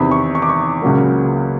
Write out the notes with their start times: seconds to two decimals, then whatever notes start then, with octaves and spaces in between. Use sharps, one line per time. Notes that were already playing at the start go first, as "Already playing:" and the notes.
Already playing: E2 C3 D#3 B5
0.11 C#6
0.35 C#6
0.42 D6
0.49 C#6
0.82 C#2 C#3 F#3 A#3